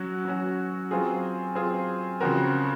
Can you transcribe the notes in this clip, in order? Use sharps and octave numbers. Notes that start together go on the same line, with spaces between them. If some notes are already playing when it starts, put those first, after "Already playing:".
Already playing: F#3 C#4 F#4
F#3 C#4 F#4
F#3 C4 F4 G#4
F#3 C4 F4 G#4
C#3 F3 C4 F#4 A#4